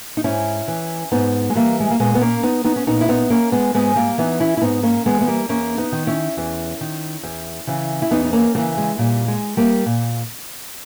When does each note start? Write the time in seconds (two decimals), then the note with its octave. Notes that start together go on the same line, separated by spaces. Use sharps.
0.17 D#4
0.24 G#2 C#4 E4
0.68 E3
1.12 G#2 B3 D#4
1.50 G#3
1.55 E3 G3 A#3
1.80 G#3
1.90 A#3
2.00 A#2 G#3 B3
2.15 B3
2.21 A#3 C#4
2.43 B3 D#4
2.64 B3 D#4
2.76 C#4
2.87 A#2 B3 D#4
3.01 E4
3.09 B3 D#4
3.30 A#3 C#4
3.52 G#3 B3
3.74 G#2 G#3 B3
3.96 G3 A#3
4.18 E3 B3 D#4
4.40 C#4 E4
4.57 E4
4.61 G#2 B3 D#4
4.83 A#3 C#4
5.05 E3 G#3 B3
5.21 B3
5.28 G3 A#3
5.49 E2 A#3 C#4
5.78 B3 D#4
5.92 D#3
6.07 C#4 E4
6.37 E2
6.81 D#3
7.23 E2
7.67 C#3 E3
8.02 E4
8.11 E2 B3 D#4
8.25 D#4
8.33 A#3 C#4
8.55 C#3 E3 G3 A#3
8.78 G#3
8.98 A#2 G3
9.28 G#3
9.57 G3 A#3
9.86 A#2